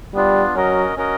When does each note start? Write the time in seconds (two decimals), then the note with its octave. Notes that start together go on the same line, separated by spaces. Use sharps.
0.14 G3 B3 D4 F4
0.55 F#3 C#4 F#4 A#4 D#5
0.96 C#4 F#4 A#4 D#5